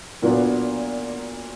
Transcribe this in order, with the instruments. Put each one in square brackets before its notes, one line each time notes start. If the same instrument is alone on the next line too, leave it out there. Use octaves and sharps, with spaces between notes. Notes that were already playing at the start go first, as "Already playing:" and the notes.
[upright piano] A#2 F#3 B3 D4